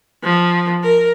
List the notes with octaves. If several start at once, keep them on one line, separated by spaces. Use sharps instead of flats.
F3
A#4